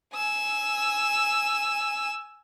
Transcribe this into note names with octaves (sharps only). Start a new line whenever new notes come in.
G#5 E6